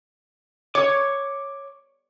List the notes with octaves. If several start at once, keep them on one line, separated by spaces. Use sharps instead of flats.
C#5 C#6 D6